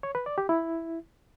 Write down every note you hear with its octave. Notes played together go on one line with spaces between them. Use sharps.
C#5
B4
D5
G4
E4